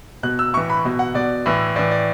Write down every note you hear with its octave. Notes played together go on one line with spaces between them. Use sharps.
B2 F#6
E6
A2 E3 C#6
B5
B2
F#5
B2 D5
A2 E3
A2 E3 D5
D5